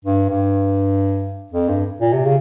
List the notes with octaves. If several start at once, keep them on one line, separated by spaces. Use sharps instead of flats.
G2
G2
F2
G2
A#2
C3
C#3